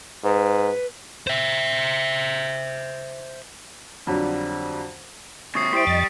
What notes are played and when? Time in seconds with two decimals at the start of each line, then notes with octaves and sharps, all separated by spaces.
0.24 G#2 B4
1.27 C5 E5
4.07 F2 D3 F#3 G3
5.55 D#2 C3 C#6 D#6 C7
5.73 G3 E4 G4 C5 C#6 D#6 D7
5.87 F2 D#5 A6